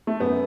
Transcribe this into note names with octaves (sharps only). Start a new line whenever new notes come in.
A3
F#2 B3